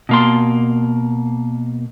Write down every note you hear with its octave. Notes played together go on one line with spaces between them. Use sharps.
B2 A#3 C6